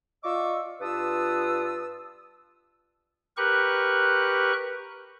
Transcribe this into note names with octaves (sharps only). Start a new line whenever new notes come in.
F4 D5 D#5 C#6 D6 E6
G2 F4 B4 A5 D#6 E6
G4 A#4 B4 C#6 F#6